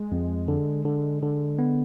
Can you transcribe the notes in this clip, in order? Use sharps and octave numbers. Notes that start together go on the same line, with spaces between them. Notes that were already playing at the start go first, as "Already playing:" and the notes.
Already playing: G#3
F2
D3
D3
D3
B3